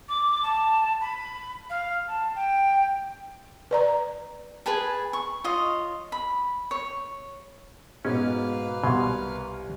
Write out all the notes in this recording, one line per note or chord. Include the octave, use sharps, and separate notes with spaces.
D6
A5
B5
F5
A5
G5
B4 D5 A#5
G#4 B4 G#5 A5
C#6
F4 C#5 D#5
B5
C#5
G#2 B2 G#3 A#3 C#4 B4 F5
C2 B2 C6 G#6